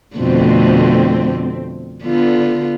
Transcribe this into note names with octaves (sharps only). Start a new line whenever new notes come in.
F2 B2 D3 A3 C4
D3 B3 F4